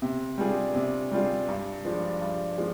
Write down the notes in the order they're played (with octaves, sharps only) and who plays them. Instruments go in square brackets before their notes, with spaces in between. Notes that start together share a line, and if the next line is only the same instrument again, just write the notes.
[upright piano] C3
G3 D4 F4 G#4
C3
G3 D4 F4 G#4
G2
F3 G#3 D4
G2
F3 G#3